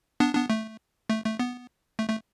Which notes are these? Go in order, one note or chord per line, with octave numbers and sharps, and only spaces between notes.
B3 D4
B3 D4
A3
A3
A3
B3
A3
A3